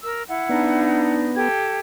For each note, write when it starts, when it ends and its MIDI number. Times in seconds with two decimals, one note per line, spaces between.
0.03 0.23 70
0.03 0.23 88
0.28 1.14 64
0.28 1.14 78
0.49 1.48 59
0.49 1.37 62
0.49 1.37 63
1.36 1.79 67
1.36 1.79 69
1.36 1.79 92